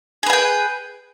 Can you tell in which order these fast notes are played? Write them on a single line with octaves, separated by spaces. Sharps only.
G#4 B4 G#5 G5